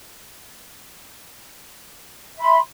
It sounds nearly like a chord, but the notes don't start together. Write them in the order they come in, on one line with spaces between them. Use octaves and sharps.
E5 B5 C6